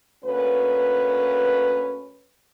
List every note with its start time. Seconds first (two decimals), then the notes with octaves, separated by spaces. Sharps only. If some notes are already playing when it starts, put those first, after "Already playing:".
0.25 D2 A#3 C#4 B4